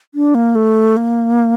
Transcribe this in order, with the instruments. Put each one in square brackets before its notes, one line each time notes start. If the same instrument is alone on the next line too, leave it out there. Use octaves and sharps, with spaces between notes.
[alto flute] D4
A#3
A3
A#3